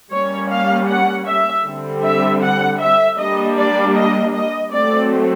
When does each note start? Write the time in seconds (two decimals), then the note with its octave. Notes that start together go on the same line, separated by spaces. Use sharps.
0.11 G3 A#3 C#4 C#5
0.50 F5
0.89 F#5
1.26 E5
1.65 D3 G3 C4
2.03 E5
2.41 F#5
2.80 E5
3.18 G3 A#3 D4 D#5
3.57 D5
3.95 D#5
4.33 D#5
4.71 F#3 A3 C4 D5